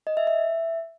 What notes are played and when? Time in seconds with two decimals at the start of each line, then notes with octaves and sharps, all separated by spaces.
0.07 D#5
0.17 E5
0.27 E5